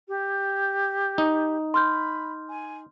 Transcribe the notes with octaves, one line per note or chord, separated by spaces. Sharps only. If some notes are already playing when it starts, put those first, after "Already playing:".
G4
D#4
B5 C6 F6 G6
G#5